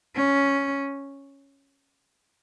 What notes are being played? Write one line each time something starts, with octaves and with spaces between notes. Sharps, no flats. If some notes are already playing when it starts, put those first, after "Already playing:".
C#4